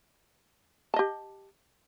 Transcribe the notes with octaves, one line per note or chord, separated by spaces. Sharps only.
G4 D#5 A5